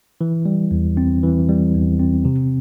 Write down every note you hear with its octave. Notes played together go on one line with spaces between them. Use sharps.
E3
G3
E2
C4
E3
G3
E2
C4
C3